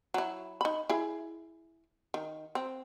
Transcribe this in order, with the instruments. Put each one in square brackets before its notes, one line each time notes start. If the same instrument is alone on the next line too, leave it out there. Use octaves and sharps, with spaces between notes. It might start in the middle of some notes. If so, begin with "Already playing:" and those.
[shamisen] F#3 E4
D#4 B5
E4 G#4
D#3
C4